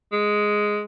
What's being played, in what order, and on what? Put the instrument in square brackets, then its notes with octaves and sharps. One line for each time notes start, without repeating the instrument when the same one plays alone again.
[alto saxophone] G#3